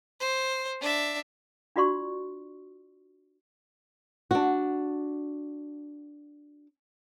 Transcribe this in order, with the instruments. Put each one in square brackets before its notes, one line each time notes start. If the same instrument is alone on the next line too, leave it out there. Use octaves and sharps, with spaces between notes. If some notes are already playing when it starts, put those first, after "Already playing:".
[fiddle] C5
D4 E5
[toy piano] D4 F4 F#4 D5 C6 C#6
[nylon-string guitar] D4 F#4